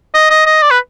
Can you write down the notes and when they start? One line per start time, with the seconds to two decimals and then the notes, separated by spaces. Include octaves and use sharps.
0.14 D#5
0.30 D#5
0.46 D#5
0.62 D5
0.71 B4